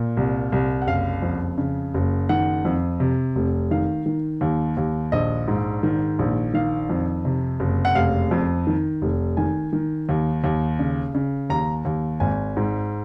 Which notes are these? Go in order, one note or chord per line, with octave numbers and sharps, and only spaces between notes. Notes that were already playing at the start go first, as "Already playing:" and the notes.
Already playing: A#2
C2
C2
F#5
F#1 F5
F2
C#3
F#1
D#3 F#5
F2
C3
F1
D#3 F5
D#3
D#2
D#2
A#1 D#5
G#2
D#3
A#1
D#3 F5
F2
C3
F#1
F#5
F1 F5
F2
D#3
F1
D#3 G#5
D#3
D#2
D#2
C#3
C#3
D#2 A#5
D#2
G#1 G#5
G#2